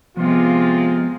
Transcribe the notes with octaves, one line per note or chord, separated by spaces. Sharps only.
C3 F3 G#3 B3 F4